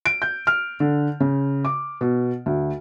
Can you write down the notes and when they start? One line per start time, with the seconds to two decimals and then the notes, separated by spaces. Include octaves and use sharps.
0.06 D7
0.22 G6
0.47 F6
0.80 D3
1.20 C#3
1.65 D6
2.01 B2
2.46 D2